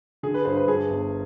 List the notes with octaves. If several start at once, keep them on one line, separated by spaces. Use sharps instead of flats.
D3 G#4
B4
G2 C5
B4
G2 G#4
G1